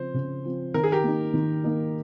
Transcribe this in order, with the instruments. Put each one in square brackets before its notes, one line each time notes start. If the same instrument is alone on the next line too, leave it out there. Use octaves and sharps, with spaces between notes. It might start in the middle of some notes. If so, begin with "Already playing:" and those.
Already playing: [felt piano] C#3 F3 C4 [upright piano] C5
[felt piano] C#3
F3 C4
[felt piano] D#3 [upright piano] A#4
[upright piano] G#4
G4 A#4
[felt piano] A#3 D#4
D#3
A#3 D#4